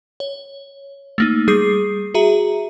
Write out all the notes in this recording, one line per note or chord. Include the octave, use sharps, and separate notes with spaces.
C#5
A3 A#3 D#4
G3 G#4 D#6 C7
F#4 G#4 E5 A#5